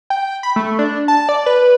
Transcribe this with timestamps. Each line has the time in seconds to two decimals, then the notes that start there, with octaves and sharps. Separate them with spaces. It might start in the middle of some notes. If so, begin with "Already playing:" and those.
0.10 G5
0.43 B5
0.56 A3
0.79 D4
1.08 A5
1.29 D5
1.46 B4